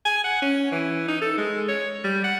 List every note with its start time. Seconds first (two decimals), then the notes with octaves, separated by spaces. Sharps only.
0.05 G#5
0.24 F#5
0.42 C#4
0.72 E3
1.08 D#4
1.22 A4
1.38 G#3
1.68 C#5
2.04 G3
2.24 F#5